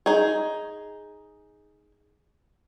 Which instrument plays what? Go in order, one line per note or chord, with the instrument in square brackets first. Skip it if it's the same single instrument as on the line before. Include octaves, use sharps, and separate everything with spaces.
[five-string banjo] D#4 G#4